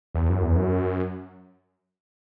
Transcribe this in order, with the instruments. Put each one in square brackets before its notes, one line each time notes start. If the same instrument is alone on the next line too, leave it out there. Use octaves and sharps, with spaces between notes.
[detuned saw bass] E2
F#2
E2
F#2